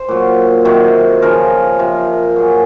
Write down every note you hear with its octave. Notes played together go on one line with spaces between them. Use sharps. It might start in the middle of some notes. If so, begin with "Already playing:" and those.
Already playing: C5
A#2 F#3
C3 D#3 F#3
C#3 F3 A#4
C3 F3
A#2 F#3 G#4